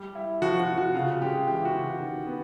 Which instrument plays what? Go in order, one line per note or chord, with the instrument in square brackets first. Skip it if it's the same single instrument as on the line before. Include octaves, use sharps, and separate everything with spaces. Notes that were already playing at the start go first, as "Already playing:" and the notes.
Already playing: [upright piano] G3
E4
[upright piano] F3 [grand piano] F#4
[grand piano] F#4
[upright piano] C3
[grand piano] F#4
[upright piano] C#3 [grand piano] F4
[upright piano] G#3 [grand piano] G4
[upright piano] E3 [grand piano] G4
[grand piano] F#4
[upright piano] C#3
D#3
B3